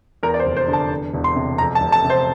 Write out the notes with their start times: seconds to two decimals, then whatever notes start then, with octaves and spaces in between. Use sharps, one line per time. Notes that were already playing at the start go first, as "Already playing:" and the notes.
0.23 E2 A#4
0.34 D5
0.40 C5
0.45 F1
0.56 C5
0.68 D3
0.73 A5
0.91 E2
1.14 E1
1.24 C6
1.36 C3
1.58 F2 A#5
1.75 A5
1.81 F1
1.92 A5
2.04 C3
2.10 C5